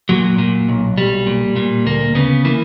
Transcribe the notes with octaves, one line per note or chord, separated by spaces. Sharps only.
A#2 F#3
A#2
B1
B1 G3
A#2
A#2
D2 A#3
C#3 B3
E3 A#3